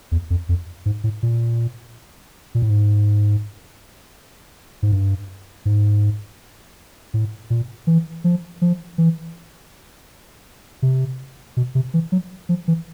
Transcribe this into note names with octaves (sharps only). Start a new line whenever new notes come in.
E2
F2
F2
G#2
A2
A#2
A#2
A2
G#2
G#2
G2
G#2
A2
A#2
E3
F3
F3
E3
C3
B2
C3
E3
F#3
F3
E3